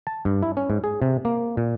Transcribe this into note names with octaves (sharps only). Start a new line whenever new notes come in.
A5
G2
E4
C#4
G#2
G#4
C3
A#3
A#2